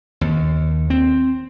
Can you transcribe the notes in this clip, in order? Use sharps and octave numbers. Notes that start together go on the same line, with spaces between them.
D#2
C4